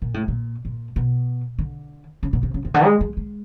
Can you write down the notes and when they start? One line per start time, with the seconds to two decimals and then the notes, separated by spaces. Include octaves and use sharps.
0.02 A#2
0.14 A2
0.28 A#2
0.65 A#2
0.96 B2
1.59 D3
2.23 C#3
2.33 B2
2.43 C3
2.54 C#3
2.65 C3
2.74 D3
2.84 G#3
3.01 G#3
3.17 G#3